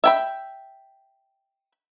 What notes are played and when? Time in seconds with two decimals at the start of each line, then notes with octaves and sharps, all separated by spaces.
0.04 E5 G5 B5